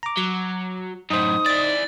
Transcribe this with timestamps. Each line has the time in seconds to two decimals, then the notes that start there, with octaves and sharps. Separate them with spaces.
0.03 A#5 D6
0.18 F#3
1.10 F#2 A2 D#4 C5 D#6
1.46 E4 D5 A6